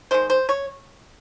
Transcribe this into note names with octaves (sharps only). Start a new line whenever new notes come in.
D#3 G#3 C5
C5
C#5